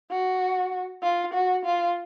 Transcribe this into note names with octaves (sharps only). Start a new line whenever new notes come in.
F#4
F4
F#4
F4